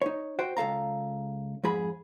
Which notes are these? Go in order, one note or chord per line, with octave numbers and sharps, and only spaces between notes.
D#4 C#5
F#4 C5 G5
C#2 A4 F5 A#5
F2 G#2 G#4 B5